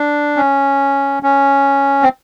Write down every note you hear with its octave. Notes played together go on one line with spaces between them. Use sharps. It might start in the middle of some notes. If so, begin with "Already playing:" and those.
Already playing: D4
C#4
C#4
C4